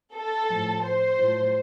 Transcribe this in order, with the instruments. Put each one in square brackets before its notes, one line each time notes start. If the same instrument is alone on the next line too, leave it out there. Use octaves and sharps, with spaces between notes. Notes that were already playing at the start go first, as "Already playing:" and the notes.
[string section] A4
A2 F3
C5
A2 F3